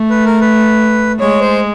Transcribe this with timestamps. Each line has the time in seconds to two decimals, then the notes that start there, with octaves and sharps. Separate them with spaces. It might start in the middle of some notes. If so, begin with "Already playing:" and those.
Already playing: A3
0.10 B4
0.25 A#4
0.41 B4
1.20 G#3 C#5
1.41 C5